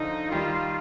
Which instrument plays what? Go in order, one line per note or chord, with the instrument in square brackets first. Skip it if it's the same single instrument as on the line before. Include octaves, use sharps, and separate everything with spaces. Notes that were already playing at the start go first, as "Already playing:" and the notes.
Already playing: [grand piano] D3 F3 [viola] D#4
[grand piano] D#3 G3 [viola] F4